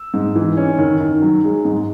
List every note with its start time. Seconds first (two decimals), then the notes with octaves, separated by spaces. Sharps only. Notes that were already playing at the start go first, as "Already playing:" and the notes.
Already playing: E6
0.14 G#2
0.35 E3
0.57 C#4
0.79 D#3
1.01 D#3
1.22 F#3
1.44 G#3
1.65 G#2